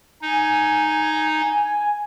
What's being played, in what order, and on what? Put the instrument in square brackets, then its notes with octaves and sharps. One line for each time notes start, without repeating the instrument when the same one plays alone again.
[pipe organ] D#4 [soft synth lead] G#5